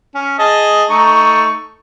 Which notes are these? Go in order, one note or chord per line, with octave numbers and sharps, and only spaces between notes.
C#4
G#4 D#5 A5
A3 D#4 C#6